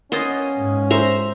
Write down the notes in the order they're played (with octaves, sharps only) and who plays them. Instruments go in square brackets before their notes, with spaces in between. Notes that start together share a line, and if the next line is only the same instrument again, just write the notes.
[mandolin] A#3 B3 D#5 [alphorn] C#4 [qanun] C6
[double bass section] G#2
[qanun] C5 E5 A#5